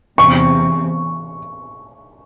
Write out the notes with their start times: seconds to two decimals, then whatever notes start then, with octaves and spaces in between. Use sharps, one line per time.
0.18 E2 C3 E3 C4 C#6